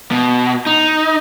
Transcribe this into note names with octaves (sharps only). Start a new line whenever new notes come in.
B2
D#4